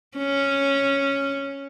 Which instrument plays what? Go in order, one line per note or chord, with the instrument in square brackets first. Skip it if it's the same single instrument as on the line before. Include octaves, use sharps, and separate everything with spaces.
[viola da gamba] C#4